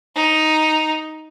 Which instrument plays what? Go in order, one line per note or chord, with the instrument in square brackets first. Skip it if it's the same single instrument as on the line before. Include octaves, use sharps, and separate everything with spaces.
[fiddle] D#4